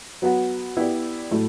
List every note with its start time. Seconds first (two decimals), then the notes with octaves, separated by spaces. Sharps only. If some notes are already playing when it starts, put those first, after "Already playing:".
0.22 F#3 B3 F#4
0.77 B3 E4 G4 D5
1.31 A2 F#3 A3 E4